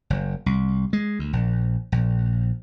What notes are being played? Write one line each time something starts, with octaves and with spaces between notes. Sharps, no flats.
F#1
C2
G#3
D2
A#1
A#1